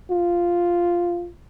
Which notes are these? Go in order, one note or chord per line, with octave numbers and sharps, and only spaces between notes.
F4